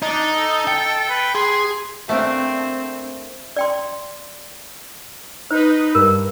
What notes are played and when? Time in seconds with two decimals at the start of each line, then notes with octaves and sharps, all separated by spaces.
0.02 D4 D#4
0.34 A4
0.67 G5
1.10 B4
1.35 G#4 C6
2.09 A3 A#3 C4 D4
3.56 D5 G5 C6
5.51 D#4 B4 C5
5.95 G2 A#4